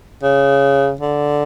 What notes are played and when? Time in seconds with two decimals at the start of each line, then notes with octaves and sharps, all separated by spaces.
0.23 C#3
1.01 D3